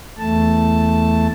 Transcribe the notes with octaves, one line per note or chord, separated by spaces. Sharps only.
E2 A3 A5